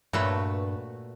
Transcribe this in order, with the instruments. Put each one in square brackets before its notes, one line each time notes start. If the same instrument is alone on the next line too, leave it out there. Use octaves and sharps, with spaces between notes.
[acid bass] G2 [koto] A#2 A3 F#4 [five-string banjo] B4 C#5